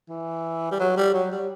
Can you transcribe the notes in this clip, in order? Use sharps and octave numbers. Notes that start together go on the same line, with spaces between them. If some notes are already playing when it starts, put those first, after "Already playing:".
E3
G3
F#3
G3
F#3
G3